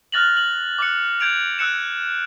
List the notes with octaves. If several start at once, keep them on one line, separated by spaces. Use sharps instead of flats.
F6 F#6 A6 A#6 F7 F#7
F#7
D6 F#6 C#7
G6 G#6 D7 F7
E6 F#6 C#7 E7